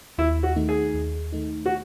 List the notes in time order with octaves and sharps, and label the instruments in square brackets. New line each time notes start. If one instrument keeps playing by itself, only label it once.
[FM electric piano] D#2 [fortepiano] E4
[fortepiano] F#4
[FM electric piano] D#3 A3 D#4
[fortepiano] G#4
[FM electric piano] D#2
D#3 A3 D#4
[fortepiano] F#4